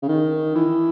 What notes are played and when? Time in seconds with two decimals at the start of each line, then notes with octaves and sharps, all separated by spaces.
0.02 C#3
0.08 D#3
0.55 E3